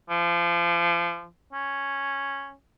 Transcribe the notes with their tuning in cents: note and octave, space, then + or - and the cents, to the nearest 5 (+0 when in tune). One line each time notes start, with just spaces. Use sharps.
F3 -30
C#4 -5